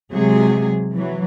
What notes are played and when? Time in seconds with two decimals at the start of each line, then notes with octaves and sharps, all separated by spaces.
0.12 C3 F#3 G#3 G#4
0.92 E3 F#3